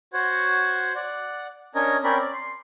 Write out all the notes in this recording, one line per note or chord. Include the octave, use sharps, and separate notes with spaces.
F#4 C5 C#5 F#5
D5 F#5
C#4 D4 A#4 C#5 D#5
C4 C#4 A#4 D5 B5
D5
C6